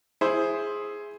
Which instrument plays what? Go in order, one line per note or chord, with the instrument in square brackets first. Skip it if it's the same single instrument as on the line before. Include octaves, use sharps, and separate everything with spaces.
[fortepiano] E4 C5 [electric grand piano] G#4